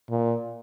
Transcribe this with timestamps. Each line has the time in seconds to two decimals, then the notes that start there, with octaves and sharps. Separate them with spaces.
0.10 A#2